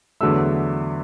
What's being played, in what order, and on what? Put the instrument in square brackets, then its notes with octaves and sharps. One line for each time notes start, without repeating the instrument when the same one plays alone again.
[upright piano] E2 D3 F#3 A3 E6